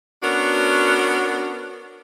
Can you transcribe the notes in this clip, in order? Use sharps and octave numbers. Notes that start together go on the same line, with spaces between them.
B3 C#4 D4 F#4 A#4